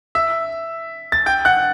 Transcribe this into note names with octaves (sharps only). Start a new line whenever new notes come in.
E5 E6
A6
G5 G6
F#5 F#6